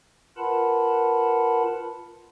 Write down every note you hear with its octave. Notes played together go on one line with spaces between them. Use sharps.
F4 A#4 B4 F#5 A5 B5